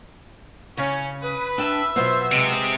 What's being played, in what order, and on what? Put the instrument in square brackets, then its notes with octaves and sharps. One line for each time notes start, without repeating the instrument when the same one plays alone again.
[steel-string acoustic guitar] C#3 [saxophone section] C#4
[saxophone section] B4 [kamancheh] D#6
[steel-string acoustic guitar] D4 G5 A5 [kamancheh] E5 E6
[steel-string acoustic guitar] B2 F#3 B3 [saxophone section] F4 C5
[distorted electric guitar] C3 [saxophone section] G#3